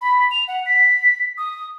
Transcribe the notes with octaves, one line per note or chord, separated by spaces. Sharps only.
B5
F7
F#5
B6
D#6